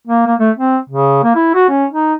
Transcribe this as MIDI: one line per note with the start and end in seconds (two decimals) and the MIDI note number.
0.07 0.25 58
0.27 0.35 58
0.40 0.51 57
0.57 0.78 60
0.90 1.21 49
1.23 1.32 58
1.36 1.52 64
1.55 1.69 66
1.69 1.85 61
1.91 2.14 63